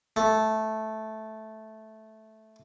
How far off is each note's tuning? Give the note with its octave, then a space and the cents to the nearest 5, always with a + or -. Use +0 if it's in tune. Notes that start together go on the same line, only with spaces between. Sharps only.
A3 -10